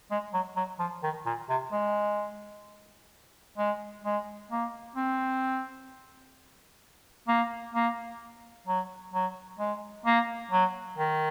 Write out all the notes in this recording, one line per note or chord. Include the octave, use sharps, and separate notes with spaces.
G#3
F#3
F#3
F3
D#3
A#2
C3
G#3
G#3
G#3
A#3
C4
A#3
A#3
F#3
F#3
G#3
A#3
F#3
D#3